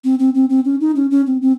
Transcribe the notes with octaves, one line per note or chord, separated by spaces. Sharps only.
C4
C4
C4
C4
C#4
D#4
C#4
C#4
C4
C4